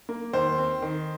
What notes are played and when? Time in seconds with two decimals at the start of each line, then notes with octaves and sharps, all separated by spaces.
0.09 A#3
0.33 D#2 C5
0.58 C4
0.82 D#3